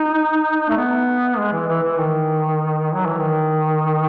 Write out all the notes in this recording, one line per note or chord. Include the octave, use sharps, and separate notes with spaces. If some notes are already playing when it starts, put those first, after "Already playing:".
Already playing: D#4
A3
B3
G#3
E3
E3
E3
D#3
F#3
E3
D#3